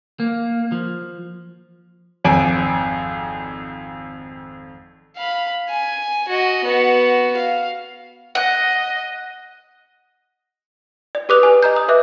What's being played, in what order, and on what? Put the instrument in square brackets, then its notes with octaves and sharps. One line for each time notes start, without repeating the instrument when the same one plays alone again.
[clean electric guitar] A#3
F3
[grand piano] G#1 F2 G#5 D7
[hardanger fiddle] F5 B5
G#5
F#4 D#5
B3 F#4
F5
[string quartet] D#5 [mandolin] F#5
[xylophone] D5
G4 B4 D6 D#6 F#6 F7
G4 B4 G#5
D#5 A#5 G6
D#6
B4 D#5 E5 D6 F#6